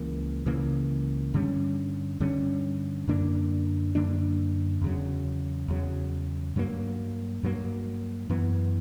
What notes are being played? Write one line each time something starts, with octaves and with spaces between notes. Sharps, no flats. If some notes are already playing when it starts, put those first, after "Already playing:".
Already playing: C#2 C#3 E3 A#3
C#2 C#3 E3 A#3
G2 D3 G3 C#4
G2 D3 G3 C#4
F#2 D3 A#3 D4
F#2 D3 A#3 D4
E2 C#3 F#3
E2 C#3 F#3
G2 F#3 A#3
G2 F#3 A#3
F#2 E3 B3